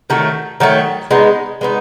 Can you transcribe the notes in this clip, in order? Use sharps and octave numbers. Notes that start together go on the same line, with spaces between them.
D#3 F#3 A3
D#3 F#3 A3
G#3 B3 D#4
G#3 B3 D#4